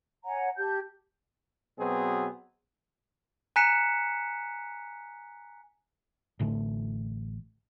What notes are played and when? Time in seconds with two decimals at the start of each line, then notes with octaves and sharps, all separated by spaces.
0.25 C#5 F#5 G#5 A#5
0.55 G4 A5 G6
1.79 B2 F#3 B3 C4 G#4
3.56 G#5 A#5 F#6 B6 C#7 E7
6.39 A1 A2 D3 A3